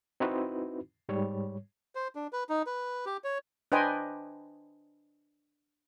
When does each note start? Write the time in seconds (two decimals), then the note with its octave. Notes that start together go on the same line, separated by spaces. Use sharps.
0.20 C4 D#4 E4 F#4 B4
1.09 G#2 G3 C#5
1.95 C5
2.15 D4
2.33 B4
2.49 D#4
2.66 B4
3.06 G4
3.24 C#5
3.72 D4 B4 C5 D#5 G5 G#5